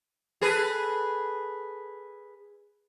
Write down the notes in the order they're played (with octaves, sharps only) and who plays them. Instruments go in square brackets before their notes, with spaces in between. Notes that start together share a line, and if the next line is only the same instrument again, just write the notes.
[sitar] G#4 A4 B4